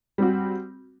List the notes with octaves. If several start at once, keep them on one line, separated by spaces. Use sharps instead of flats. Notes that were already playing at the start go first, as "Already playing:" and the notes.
G3 C4 F#4